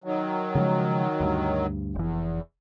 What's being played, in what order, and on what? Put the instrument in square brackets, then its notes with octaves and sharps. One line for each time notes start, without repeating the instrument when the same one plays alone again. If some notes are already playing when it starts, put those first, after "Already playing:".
[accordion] D#3 F#3
[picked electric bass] C#3 F3 G#3
D2 G2
[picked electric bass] F1 E3 [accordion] E2